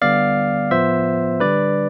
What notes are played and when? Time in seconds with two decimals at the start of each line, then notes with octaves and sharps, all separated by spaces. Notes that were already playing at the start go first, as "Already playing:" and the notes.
0.02 D3 G3 B3 D5 F5
0.71 A2 F3 B3 F4 C5 E5
1.40 D3 G3 D4 B4 D5